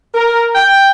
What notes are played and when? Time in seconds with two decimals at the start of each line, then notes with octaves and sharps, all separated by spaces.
0.14 A#4
0.55 G5